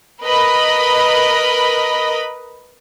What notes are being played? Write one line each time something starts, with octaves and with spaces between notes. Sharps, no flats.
A#4 B4 D#5 B5